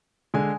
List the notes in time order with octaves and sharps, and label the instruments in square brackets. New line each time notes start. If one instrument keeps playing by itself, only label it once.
[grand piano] D3 G#3 G#5